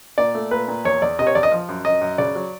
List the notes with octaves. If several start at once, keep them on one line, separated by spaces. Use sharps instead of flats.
A#2 D5
A3
A#2 B4
A#2
E2 C#5
E2 D5
C3 D#5
C#5
E2 D5
D#5
F3
F#2
F#2 D#5
F#2
C#3 D5
F#3